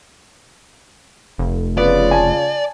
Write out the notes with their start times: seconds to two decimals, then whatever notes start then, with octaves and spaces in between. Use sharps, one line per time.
1.38 F1
1.78 C#3 B3 F4 D5
2.11 G#5 A5